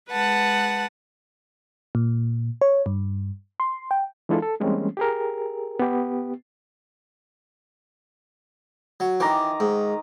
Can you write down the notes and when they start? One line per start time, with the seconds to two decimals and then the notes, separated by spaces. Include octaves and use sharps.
0.11 G#3 B4 F#5 A5
1.95 A#2
2.61 C#5
2.86 G2
3.60 C6
3.91 G5
4.29 E3 G#3 D4 E4 F4 A4
4.42 A4
4.60 E3 G3 G#3 A#3 C4 C#4
4.97 G4 G#4 A#4
5.79 B3 G4
9.00 F#3
9.20 D#3 E3 A#5 D6
9.60 G#2